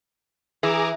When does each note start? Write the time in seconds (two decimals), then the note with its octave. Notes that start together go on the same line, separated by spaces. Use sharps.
0.63 E3 G#4 A#5 D6